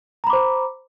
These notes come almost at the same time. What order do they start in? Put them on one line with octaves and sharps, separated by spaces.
A#5 B5 D6 C5